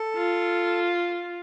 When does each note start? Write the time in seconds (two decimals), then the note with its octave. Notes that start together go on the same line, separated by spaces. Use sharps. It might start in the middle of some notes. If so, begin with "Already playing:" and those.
Already playing: A4
0.16 F4